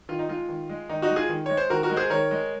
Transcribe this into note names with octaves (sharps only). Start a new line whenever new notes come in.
D#3 F4
D#4
G#3 F4
D#3
G#3
D#3 D#4
D#4 F#4
G#3
F4 G#4
D#3
G#3 C#5
C5
D#3 F#4 A#4
F#4 A#4
G#3
G#4 C5
D#3 A#4 C#5
G#3